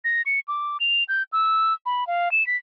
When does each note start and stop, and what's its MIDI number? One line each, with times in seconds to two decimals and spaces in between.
0.04 0.22 94
0.26 0.40 97
0.48 0.77 86
0.80 1.04 101
1.09 1.23 91
1.33 1.74 88
1.86 2.07 83
2.07 2.32 77
2.32 2.46 100
2.47 2.56 95